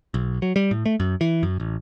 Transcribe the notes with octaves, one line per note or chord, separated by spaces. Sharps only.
B1
F#3
G3
A2
A3
F#2
E3
F#2
A1